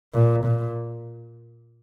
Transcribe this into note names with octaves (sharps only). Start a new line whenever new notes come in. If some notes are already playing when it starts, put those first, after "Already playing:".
A#2
A#2